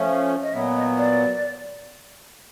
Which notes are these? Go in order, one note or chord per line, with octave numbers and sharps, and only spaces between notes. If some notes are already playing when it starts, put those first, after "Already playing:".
Already playing: F3 A3 C#4
F5
D#5
A#2 F#3 B3 E5
D#5
D5